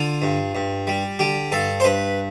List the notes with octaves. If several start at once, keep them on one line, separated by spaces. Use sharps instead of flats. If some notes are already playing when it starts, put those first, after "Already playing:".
Already playing: D3 F4
G2
G2
G3
D3 G4
G2 A4
C5
G2 B4